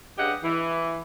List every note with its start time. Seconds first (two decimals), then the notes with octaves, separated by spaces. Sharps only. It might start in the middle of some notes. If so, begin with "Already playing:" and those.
0.18 G2 C#3 G4 D#5 F#5
0.44 E3